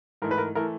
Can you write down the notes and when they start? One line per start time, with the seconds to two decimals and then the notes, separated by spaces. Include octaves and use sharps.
0.22 G#2 E3 A3 A#4
0.31 B4
0.38 A#4
0.55 E3 A3 A#4